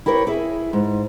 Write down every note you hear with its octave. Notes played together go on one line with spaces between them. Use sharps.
E4 G4 A#4 B4 C#5
E4 G#4 E5
G#2